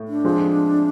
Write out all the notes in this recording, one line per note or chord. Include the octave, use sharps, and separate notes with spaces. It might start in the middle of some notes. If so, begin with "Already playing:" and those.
Already playing: A2
D4
F3 G#3 C4 F4